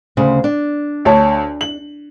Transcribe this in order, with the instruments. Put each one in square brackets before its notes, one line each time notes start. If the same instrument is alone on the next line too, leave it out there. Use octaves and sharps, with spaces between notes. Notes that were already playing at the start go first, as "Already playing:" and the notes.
[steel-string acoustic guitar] D2 C#3 C5
D4
[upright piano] D2 C#5 A5
F#7